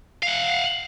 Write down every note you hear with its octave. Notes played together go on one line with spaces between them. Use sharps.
F5 F#5